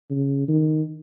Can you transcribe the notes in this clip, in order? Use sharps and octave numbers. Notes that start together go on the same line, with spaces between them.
C#3
D#3